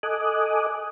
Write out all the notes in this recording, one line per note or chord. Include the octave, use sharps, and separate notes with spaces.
A4 D#5 G#5 D6 D#6 F#6